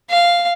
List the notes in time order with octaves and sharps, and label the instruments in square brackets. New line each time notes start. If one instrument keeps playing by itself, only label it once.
[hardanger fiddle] F5